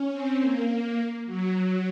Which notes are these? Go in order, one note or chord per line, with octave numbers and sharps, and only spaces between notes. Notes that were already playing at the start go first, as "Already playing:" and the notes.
Already playing: C#4
C4
A#3
F#3